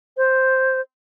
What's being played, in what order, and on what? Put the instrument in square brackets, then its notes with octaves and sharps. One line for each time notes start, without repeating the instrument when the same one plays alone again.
[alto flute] C5